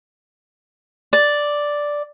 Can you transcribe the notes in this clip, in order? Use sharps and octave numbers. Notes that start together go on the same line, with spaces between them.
D5